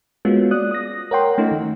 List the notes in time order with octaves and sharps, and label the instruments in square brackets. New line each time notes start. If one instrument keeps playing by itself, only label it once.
[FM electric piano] G#3 A#3 B3 C#4 F4 F#4
D5 D#6 F#6
D#6 A#6
A#4 C#5 F#5 G5 C6
A3 C#4 D#4 F4
D#3